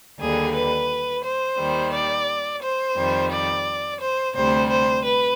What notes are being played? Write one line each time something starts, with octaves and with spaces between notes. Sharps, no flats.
D#2 D3 G3 G#4
B4
C5
D#2 D#3 G3
D5
C5
F2 D#3 G3
D5
C5
D2 C3 G3 C5
C5
B4